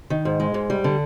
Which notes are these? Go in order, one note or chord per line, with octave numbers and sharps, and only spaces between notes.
D#3
G#2
G#3
G#2
G3
D3